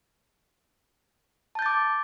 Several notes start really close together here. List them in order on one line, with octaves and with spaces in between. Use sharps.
A5 G6 A6 D6